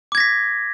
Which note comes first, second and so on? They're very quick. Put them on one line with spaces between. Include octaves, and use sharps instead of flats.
D6 G#6 A#6 B6